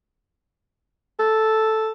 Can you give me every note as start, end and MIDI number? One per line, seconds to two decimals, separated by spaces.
1.19 1.90 69